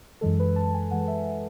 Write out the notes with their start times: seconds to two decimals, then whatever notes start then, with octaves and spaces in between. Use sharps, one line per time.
0.21 F#2 E3 G#3 A4
0.40 B4
0.56 A5
0.74 G#5
0.91 F#2 E3 G#3 F#5
1.08 E5